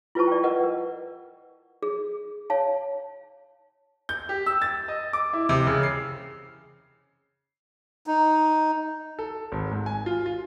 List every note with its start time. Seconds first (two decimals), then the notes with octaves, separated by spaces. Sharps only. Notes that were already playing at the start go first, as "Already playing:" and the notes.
0.15 E4 F4 B4 C5 A5 C#6
0.27 D5 G5
0.44 A#4 B4 D#5 F#5
0.63 A#4
1.83 G#4
2.50 C#5 F5 A5
4.09 G6
4.29 G4
4.46 E6
4.62 A6
4.88 D#5
5.13 D6
5.33 E4
5.49 C3
5.67 C#3
5.83 C7
8.07 D#4
9.19 A4
9.52 G#1
9.71 G#2
9.86 G#5
10.06 F4
10.26 F4